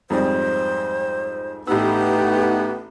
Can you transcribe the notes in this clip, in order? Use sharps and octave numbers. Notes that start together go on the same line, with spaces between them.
F2 G#2 G3 C5
A1 A3 B3 D#4 G4 E6